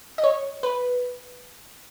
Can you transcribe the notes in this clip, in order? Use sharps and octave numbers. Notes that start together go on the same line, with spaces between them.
D#5
C#5
B4